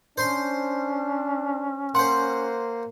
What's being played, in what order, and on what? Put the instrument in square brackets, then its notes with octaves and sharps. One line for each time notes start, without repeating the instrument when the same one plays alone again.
[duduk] C#4 [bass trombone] D4 [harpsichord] C5 C6
[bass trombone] A#3 [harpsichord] C5 F#5 [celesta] C6